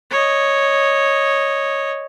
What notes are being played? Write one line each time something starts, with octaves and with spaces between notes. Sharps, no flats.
C#5 D#5